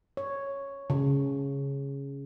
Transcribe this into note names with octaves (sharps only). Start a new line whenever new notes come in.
C#5
C#3